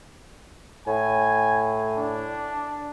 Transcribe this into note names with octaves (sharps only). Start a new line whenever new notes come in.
A2 G#5
D4